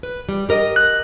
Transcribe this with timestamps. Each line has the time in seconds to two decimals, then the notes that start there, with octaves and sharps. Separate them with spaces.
0.03 B4
0.29 G3
0.49 G4 A#4 D#5
0.76 F#6